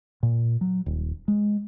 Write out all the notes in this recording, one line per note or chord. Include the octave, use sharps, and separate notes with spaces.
A#2
F#3
D#1
G#3